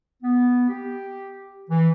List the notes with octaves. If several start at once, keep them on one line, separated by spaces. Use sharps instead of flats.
B3
G4
E3